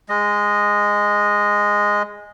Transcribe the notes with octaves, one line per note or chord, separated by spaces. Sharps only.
G#3 D#5